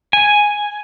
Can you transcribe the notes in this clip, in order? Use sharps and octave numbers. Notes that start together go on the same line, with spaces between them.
G#5